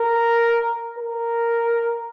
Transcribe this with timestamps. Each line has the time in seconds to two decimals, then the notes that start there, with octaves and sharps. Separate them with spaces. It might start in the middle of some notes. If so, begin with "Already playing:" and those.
Already playing: A#4
0.97 A#4